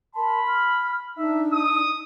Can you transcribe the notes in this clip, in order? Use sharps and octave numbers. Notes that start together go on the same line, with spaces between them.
A#4 A5 B5 C6
F6
D4 D#4 E5
D#6